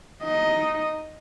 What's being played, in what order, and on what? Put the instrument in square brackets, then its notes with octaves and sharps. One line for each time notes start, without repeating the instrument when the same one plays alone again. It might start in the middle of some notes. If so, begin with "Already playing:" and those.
[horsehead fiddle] D#4 D#5